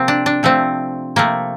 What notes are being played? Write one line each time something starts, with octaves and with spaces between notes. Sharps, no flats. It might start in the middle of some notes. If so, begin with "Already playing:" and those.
Already playing: C3 F3 A#3 C4
D4
D4
C3 F3 A3 C4
C3 F3 A3 A#3